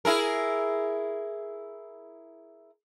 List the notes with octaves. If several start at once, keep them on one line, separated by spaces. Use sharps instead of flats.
E4 G#4 A#4